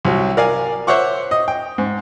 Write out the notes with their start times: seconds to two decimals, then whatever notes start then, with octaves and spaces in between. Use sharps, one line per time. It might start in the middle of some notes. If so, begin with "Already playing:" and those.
0.05 C2 F#3
0.37 A#4 D5 F5 G#5
0.87 C5 C#5 E5 F#5 C#6 D6
1.31 D#5
1.48 G5
1.78 G#2